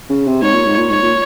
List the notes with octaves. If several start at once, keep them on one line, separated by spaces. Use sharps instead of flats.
C#3
C3
G#2 C#5
A#2
G#2
A#2
G#2 C#5
A#2